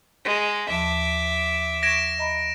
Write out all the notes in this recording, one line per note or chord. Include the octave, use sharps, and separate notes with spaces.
G#3
D#2 F3 E5 A5 D6
C#6 G#6 A#6 D7 E7
D#5 A#5 B5